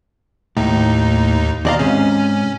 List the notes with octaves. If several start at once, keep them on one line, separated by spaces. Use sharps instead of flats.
D#2 A2 D#4
D#2 B2 D5 D#5 F5 A#5
G#2 C3 C#4